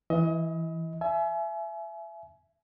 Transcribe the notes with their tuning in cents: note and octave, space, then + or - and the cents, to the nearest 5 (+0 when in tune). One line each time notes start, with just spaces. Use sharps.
E3 +0 D#5 +35
E5 +20 G#5 +40